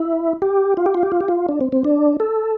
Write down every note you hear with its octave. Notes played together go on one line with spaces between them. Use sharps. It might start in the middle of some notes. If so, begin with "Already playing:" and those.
Already playing: E4
G4
F4
G4
F4
G4
F4
G4
F4
D4
C4
C4
D4
A4